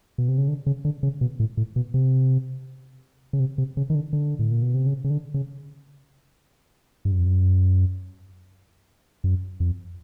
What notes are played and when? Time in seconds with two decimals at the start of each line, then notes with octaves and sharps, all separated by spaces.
0.18 B2
0.28 C3
0.38 C#3
0.48 D3
0.66 C#3
0.85 D3
1.03 C#3
1.21 B2
1.40 A2
1.57 A2
1.76 B2
1.94 C3
3.33 C#3
3.40 C3
3.58 C3
3.77 C#3
3.90 D#3
3.95 D3
4.13 D3
4.39 A2
4.51 A#2
4.62 B2
4.74 C3
4.86 C#3
5.04 C#3
5.10 D3
5.34 C#3
7.05 G2
7.12 F#2
7.19 F2
7.26 F#2
9.24 F#2
9.60 F2